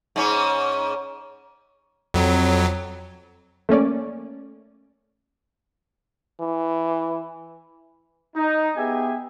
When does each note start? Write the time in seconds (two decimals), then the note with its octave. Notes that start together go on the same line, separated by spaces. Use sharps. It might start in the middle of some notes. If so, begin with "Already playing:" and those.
0.16 G#2 C#4
2.14 F2 F#3
3.69 A3 A#3 C#4 D5
6.40 E3
8.36 D#4
8.77 B3 G4 G#4 E5 G#5